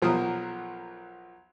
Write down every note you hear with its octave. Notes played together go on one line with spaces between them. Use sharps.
B1 F3 F#3 A#3 A#4 D#6